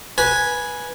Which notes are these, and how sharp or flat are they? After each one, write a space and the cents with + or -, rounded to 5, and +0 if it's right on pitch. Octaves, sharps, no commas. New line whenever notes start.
B4 -15 G#5 +0